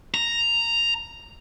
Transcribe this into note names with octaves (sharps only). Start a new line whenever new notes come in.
A#5